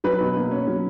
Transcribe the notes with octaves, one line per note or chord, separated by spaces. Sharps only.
F#3 B4
B2
A#3
C#4
F#3